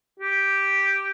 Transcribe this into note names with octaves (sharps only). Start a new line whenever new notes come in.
G4